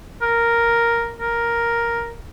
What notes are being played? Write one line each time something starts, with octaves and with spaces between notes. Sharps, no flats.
A#4
A#4